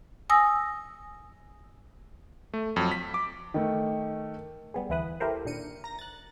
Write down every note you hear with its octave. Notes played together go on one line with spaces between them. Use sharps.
G#5 D#6 E6 A#6
A3
F2 F#3
B6
D6
D#3 A3
G3 B3 G#4
D2 E3 E4 B4 D#6 F#6
E4 G4 A4 A#4 C5
A#2 D#3 D4 C#7 D#7
A#5 A#6
F#6 A6